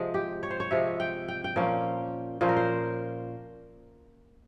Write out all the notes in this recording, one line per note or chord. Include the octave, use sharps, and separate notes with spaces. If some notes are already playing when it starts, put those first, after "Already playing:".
Already playing: C3 F3 G#3
G4
C#5
C5
C#5
C3 F3 G#3 E5
G5
G5
G5
A#2 F3 A#3 C#4
A#2 F3 A#3 C#4 C5
A#4
C5